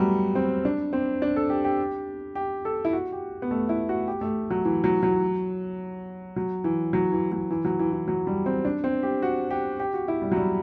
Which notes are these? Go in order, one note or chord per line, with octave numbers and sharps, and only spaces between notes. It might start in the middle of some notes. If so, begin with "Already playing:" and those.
Already playing: F#3 G3 A3 B3
C4
D4
C4
D4
A4
G4
G4
G4
A4
E4
F#4
G4
B3
A3
E4
F#4
G4
A3
F#3
E3
F#3
F#3
F#3
E3
F#3
E3
F#3
E3
F#3
E3
E3
F#3
G3
C4
D4
C4
G4
F#4
G4
G4
F#4
E4
G3
F#3
G3